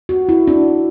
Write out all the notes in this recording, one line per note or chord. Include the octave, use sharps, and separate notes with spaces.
F#4
E4
D4